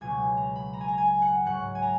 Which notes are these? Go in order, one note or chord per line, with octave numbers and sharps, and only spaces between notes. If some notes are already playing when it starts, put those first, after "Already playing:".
C#2 B2 F#3 G#5
A#5
B5
A#5
G#5
A#5
G#5
F#5
G#2 F#3 F#5
G#5
A#5